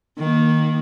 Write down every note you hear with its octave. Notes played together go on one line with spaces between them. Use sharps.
D#3 A#3